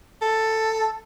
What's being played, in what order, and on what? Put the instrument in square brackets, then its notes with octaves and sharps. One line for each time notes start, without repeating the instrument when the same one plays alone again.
[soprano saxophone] A4